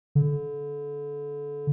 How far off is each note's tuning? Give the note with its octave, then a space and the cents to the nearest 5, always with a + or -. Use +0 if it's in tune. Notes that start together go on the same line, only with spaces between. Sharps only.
D3 -30